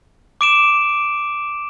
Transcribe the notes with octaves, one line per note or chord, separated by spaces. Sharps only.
D6 D7 E7